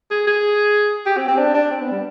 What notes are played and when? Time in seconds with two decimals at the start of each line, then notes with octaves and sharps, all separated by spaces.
0.11 G#4
0.27 G#4
1.06 G4
1.17 C4
1.28 C4
1.38 D4
1.54 D4
1.71 C4
1.81 B3
1.91 G3